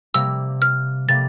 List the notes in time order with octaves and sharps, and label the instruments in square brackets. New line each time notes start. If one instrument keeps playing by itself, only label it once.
[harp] C3 G3 A#3 [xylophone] E6
[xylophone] F6
[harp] C3 G3 A#3 [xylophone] A6